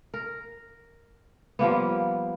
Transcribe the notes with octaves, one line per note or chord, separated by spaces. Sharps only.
A#4
F3 G3 A#3 B3